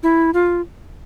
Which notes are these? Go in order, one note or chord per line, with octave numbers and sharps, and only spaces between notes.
E4
F4